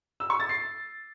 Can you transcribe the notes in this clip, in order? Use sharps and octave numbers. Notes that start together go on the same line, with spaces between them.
E6
C#6
A6
C7